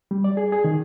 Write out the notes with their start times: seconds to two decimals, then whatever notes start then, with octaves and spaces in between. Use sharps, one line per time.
0.11 G3
0.24 D5
0.37 G#4
0.52 G#4
0.64 D#3